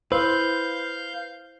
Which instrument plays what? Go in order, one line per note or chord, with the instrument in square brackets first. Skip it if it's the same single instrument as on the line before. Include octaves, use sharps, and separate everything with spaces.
[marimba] E4 [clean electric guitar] B4 [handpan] C5 [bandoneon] F5 G6